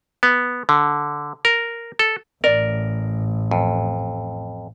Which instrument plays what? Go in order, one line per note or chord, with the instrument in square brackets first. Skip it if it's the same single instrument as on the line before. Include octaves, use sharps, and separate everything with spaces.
[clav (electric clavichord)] B3
D3
A#4
A4
[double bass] A1 [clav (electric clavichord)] A#4 [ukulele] D5
[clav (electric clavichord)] F2